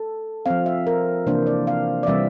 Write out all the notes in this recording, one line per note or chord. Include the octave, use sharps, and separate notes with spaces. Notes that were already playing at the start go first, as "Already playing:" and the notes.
Already playing: A4
F3 C4 F5
E5
A#4
C3 E3 A#3 D4 C5
D5
F5
D5
C3 E3 G3 C4 E5